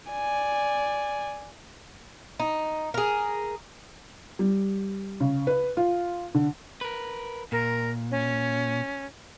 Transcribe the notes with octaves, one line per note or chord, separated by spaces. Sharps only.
D5 G#5
D#4
G#4 A#4
G3
C#3
B4
F4
D3
A#4 B4
A#2 A#4
C#4